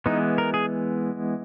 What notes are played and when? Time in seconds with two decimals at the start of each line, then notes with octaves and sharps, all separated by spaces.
0.06 E3 G#3 B3 D#4
0.38 A#4
0.54 G#4